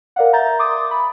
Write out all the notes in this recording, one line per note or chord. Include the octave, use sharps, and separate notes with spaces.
A#4 D5 F5 F#5
E5 A#5 G6 A6
C6 D6 D#6 A6
B5